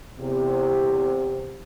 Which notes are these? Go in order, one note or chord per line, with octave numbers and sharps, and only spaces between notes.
E2 C3